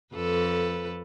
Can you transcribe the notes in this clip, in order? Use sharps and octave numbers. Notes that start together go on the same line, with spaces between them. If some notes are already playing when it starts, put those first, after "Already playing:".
F2 A4 B4